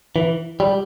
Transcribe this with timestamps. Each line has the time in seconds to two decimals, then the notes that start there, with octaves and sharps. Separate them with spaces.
0.16 E3
0.60 G3